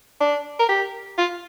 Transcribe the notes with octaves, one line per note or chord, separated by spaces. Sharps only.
D4
A#4
G4
F4